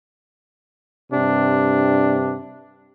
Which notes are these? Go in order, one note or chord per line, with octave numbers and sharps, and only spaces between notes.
G2 C3 D4